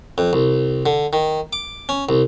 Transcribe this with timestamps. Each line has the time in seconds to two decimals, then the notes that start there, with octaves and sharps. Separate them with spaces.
0.18 F2
0.33 C2
0.86 D3
1.13 D#3
1.53 D6
1.89 C#4
2.09 C2